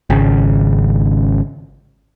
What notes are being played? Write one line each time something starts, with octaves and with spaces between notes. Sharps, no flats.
G#1 C#3 C#4